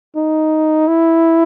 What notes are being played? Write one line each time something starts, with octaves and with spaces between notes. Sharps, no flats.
D#4
E4